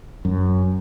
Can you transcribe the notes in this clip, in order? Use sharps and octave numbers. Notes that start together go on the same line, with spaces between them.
F#2